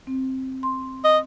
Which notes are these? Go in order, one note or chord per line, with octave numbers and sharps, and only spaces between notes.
C4
C6
D#5